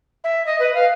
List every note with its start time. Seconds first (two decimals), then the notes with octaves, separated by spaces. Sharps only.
0.24 E5
0.46 D#5
0.60 B4
0.74 F5